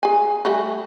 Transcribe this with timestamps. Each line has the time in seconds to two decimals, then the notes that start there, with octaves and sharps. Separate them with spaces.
0.03 G#4 G#5
0.45 G3 A3 F#4